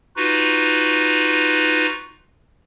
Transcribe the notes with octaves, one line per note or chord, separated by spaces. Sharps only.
D#4 F4 F#4 B4